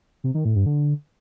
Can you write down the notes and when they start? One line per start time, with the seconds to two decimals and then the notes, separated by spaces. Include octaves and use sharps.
0.24 C3
0.34 D#3
0.45 A2
0.55 G2
0.66 D3